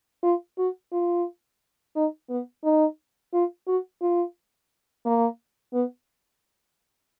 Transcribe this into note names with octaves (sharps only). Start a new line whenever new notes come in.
F4
F#4
F4
D#4
B3
D#4
F4
F#4
F4
A#3
B3